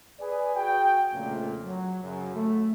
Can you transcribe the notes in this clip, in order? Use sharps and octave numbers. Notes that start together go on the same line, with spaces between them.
G#4 B4 D5 G#5
F#4 G#4 G5
F2 A#2 C#3 A3
F#3
F#2 C#3 F#3
A3